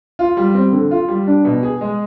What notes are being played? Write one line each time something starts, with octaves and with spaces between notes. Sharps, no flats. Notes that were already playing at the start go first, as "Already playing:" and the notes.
F4
G3
C4
D3
F4
G3
D4
B2
G#4
G#3